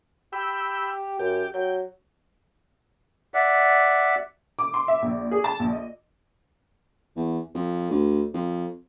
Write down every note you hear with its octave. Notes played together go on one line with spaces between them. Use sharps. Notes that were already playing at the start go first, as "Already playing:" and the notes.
G4 G5 B5 E6
F#2 G4
F#3 G5
D5 E5 F#5
D6
C6
E5
A#1
G#4
A5
A#1
D#5
E2
F2
D2
F2